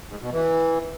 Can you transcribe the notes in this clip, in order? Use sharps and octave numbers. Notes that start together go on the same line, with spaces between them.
G#2
B2
E3